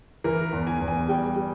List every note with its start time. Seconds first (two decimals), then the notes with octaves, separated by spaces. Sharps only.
0.24 E3 A#4
0.52 E2
0.67 G#5
0.80 E2
0.88 G#5
1.08 G3 G5
1.36 G3